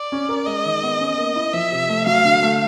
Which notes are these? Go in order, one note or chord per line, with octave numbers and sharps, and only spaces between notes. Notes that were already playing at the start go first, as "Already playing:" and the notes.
Already playing: D5
C#4
A#4
G#3 D#5
D#3
B3
C#4
A#3
E4
F3 E5
C3
A3
F#3 F5
D3
A3